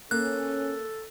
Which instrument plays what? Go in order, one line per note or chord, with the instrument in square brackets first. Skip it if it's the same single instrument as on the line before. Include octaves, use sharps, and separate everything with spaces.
[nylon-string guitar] A#3 [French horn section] C#4 [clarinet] A4 [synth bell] F#6